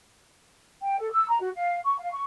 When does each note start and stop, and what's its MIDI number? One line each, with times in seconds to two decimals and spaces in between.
0.82 0.97 79
0.99 1.09 69
1.11 1.26 88
1.28 1.38 82
1.40 1.49 66
1.55 1.80 77
1.84 1.98 85
1.99 2.12 77
2.12 2.24 85